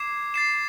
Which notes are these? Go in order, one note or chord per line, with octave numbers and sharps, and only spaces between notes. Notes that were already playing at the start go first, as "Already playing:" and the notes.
Already playing: D6 G#6 C7 E7
A6 C7 E7